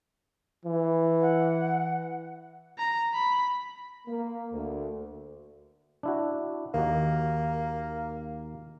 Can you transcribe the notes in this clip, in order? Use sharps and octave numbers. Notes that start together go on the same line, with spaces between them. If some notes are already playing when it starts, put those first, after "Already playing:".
E3
F#5
A#5
B5
A#3
D2
D4 E4 F#4
D#2 D#3 A#3 F#4